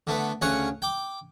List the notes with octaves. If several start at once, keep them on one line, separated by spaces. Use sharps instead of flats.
D3 A3 B3
D2 C#3 C#5 F#5 D#6
G5 D6